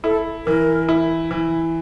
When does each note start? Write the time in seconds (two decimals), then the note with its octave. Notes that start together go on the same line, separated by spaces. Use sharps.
0.04 E4 A4
0.46 E3 A#4
0.89 E4
1.31 E3